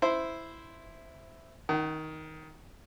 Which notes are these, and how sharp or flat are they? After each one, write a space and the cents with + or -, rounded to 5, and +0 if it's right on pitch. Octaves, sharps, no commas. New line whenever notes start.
E4 +0 C5 -10
D#3 +10 F#5 +45